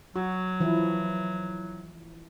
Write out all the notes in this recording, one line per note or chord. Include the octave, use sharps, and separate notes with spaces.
F#3 F#4
E3 F3 E4